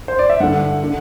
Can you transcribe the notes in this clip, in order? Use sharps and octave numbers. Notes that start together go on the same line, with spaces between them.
C5
D5
E5
G2 D3 F#5
D3